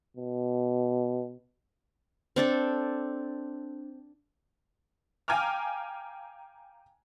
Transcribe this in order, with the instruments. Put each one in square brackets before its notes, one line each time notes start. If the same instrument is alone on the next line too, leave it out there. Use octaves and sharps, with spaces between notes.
[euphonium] B2
[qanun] C4 D4 A4
[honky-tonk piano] F5 G5 G#5 A#5 D6 F6